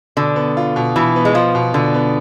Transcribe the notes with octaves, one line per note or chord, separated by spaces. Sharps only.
B2 D3
B3
F4
B2
B2 E3
B3
G#3
F3 F4
B2
B2 D3
B3